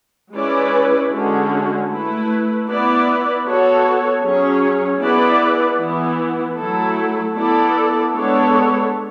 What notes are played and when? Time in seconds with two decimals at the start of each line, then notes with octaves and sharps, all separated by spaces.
0.33 G#3 C#4 E4 B4 D5
1.10 D3 G#3 C#4 F#4
1.89 A3 E4 B4
2.67 B3 E4 B4 D5
3.46 B3 F#4 A4 C#5
4.23 F#3 C#4 G#4 C#5
5.01 B3 E4 G#4 B4 D5
5.79 E3 B3 E4
6.57 F#3 A3 E4 A4
7.36 B3 E4 A4 D5
8.14 G#3 B3 D4 A4 C#5